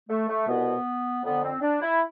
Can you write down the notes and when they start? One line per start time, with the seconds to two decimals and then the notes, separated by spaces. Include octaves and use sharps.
0.09 A3
0.28 A3
0.47 C2 B2 B3
1.24 F2 D3 B3
1.43 C4
1.61 D4
1.81 E4